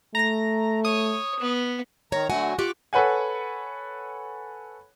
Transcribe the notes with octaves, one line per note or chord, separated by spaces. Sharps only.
A3 A#5 A#6
C#5 D#6
B3
D#3 C#5 A#5
D3 F#3 A3 F#4 F#5 G#5
F4 G4 C#6 D6 F#6
A4 B4 C#5 F#5 G#5